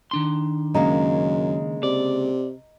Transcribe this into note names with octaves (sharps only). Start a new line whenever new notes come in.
D#3 D4 C6
F#2 C#3 G#3 A#3 D#5 A#5
C3 D5